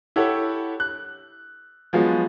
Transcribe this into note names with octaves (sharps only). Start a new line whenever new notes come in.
E4 G4 A4 C#5 F#5
F#6
F3 F#3 G#3 B3 F4 F#4